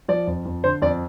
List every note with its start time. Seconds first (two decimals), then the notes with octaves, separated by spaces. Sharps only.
0.09 F3 D5
0.27 F2
0.45 F2
0.64 D3 C5
0.82 F2 D5